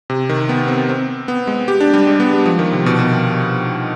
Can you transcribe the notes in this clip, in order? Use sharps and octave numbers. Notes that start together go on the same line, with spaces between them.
C3
D#3
B3
C4
C4
B3
G#3
G4
D4
G3
G#3
B3
G3
F3
D#3
C3
B2
B2